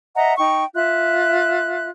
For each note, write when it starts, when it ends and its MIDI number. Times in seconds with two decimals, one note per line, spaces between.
0.16 0.34 75
0.16 0.34 76
0.16 0.34 78
0.16 0.34 82
0.38 0.65 63
0.38 0.65 79
0.38 0.65 85
0.75 1.89 65
0.75 1.89 76
0.75 1.89 90